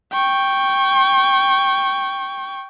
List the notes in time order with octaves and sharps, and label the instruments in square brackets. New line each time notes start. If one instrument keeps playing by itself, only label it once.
[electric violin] G5 C#6